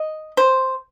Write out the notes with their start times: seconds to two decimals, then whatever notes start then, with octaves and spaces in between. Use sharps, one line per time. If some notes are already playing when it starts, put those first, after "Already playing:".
Already playing: D#5
0.37 C5